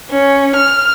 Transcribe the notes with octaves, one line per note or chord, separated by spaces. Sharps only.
C#4
F6